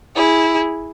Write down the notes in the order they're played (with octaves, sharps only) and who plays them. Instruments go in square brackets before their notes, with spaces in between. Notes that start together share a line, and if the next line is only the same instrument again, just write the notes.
[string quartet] E4 G#4